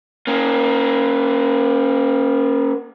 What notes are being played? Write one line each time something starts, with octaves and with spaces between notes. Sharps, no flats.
A#3 C#4